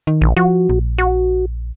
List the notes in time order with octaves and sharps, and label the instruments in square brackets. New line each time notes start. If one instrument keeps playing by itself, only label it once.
[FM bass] D#3
[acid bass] A#1
[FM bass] F3 [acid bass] F#4
[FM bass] A#1
[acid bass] F#4